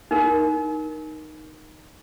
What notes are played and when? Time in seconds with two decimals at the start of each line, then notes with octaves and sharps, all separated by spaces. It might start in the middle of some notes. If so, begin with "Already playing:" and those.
0.11 D#4 A#4